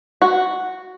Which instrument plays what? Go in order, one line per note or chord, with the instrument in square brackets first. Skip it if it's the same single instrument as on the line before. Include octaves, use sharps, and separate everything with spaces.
[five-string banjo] F#4